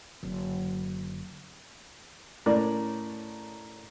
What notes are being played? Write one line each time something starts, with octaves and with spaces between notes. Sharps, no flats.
F#1 D3
A2 C#4 A#4 D5 A#5